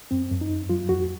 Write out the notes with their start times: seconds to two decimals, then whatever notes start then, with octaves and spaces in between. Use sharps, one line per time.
0.11 F#2 C4
0.31 F#2
0.41 D#4
0.50 F#2
0.69 F#3 F4
0.89 F2 F#4